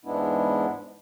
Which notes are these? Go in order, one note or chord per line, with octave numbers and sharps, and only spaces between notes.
E2 G#2 G#3 B3 D4 E4